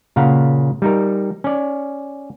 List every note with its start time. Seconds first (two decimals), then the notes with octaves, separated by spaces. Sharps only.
0.16 A#2 C#3 F5 F#5 A#5
0.82 G3 D#4 A#4
1.44 C#4 D5